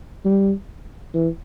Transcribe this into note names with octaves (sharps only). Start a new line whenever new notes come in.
G3
E3